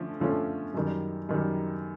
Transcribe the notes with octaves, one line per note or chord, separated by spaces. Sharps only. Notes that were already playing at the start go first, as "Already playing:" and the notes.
Already playing: D3 F3 A3 C#4
D3 F3 A3 C#4 F4
F#2 D#3 G3
F#2 D#3 G3